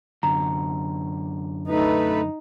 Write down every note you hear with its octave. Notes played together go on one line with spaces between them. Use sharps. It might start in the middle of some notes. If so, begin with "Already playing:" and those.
F#2 D3 A#5
A3 D#4 B4